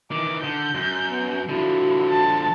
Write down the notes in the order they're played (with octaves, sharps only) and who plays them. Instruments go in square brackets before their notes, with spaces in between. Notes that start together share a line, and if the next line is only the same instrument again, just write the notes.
[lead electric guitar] D#3 E3 [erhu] D6
[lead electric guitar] D3 [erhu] G6
[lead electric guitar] F#2
[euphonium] B3
[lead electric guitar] D3 F3 [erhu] E4 [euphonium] F#4
[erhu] A5